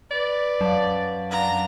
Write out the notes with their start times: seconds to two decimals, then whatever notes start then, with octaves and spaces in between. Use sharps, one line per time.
0.11 B4 D5
0.61 F#2 F5 A5
1.30 D4 F5 F#5 A#5